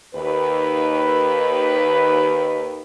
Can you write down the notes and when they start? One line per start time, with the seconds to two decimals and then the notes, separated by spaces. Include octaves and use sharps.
0.15 D#2 B4